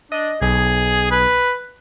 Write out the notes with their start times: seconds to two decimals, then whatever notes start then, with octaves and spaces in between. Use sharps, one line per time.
0.12 D4 D#5
0.42 B1 G#4
1.11 B4